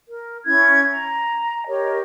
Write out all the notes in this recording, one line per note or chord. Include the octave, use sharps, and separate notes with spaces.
A#4
C#4 E4 G#6
A#5
G4 A#4 C#5 D#5